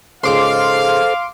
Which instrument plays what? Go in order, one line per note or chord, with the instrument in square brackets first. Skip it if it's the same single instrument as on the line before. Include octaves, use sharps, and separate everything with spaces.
[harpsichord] C#2 G#2 [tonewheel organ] A4 C5 [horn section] F5 [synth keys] C6 D6